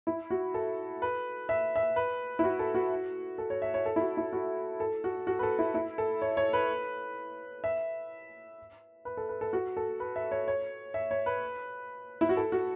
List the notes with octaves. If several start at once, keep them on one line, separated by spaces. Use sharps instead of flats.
E4
F#4
A4
B4
E5
E5
B4
E4
F#4
A4
F#4
A4
C#5
E5
C#5
A4
E4
F#4
E4
F#4
A4
F#4
F#4
B4
A4
E4
E4
A4
C#5
C#5
B4
E5
B4
A4
B4
A4
F#4
A4
B4
E5
C#5
C#5
E5
C#5
B4
E4
F#4
A4
F#4